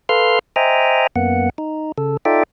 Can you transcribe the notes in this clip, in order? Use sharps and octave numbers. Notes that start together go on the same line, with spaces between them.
A4 B4 F5 C6 F6
C5 D#5 E5 G5 G#5 A#5
F#2 A#3 B3 F#5
D#4
C#3 A4
D#4 F4 A4 D5 E5 G5